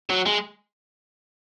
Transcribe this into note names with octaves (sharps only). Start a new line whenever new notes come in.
F#3
G#3